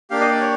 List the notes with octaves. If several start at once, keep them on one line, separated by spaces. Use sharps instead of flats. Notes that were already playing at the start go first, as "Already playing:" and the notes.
A#3 D4 G4 F5
D#5
D5
C#5